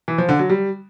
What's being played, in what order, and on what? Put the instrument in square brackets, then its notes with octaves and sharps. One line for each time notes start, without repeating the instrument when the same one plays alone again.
[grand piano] E3
F3
D3
F#3
G3